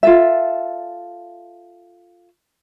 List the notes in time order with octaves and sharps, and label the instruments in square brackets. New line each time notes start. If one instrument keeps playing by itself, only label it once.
[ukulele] F4 A4 E5